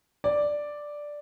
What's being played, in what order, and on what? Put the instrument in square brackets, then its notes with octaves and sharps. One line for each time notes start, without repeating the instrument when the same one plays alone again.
[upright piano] D5